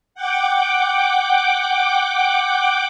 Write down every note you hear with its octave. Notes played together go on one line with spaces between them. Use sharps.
F#5 G5 D6